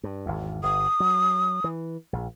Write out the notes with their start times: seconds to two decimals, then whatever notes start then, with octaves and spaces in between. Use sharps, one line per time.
0.04 G2
0.26 G#1 E2
0.63 G1 D#6
1.00 F#3
1.64 E3
2.13 A#1